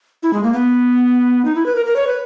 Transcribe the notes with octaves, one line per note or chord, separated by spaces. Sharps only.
E4
G#3
A#3
B3
D#4
E4
B4
A#4
A#4
C#5
B4